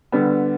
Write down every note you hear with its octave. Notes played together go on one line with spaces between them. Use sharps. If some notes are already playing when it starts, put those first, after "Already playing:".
D3 G3 B3